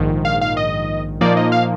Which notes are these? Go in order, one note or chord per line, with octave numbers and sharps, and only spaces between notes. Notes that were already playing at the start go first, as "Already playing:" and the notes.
Already playing: A#1 G#2 D#3
F5
F5
D#5
A#2 F3 A#3 D#4 D5
D#5
F5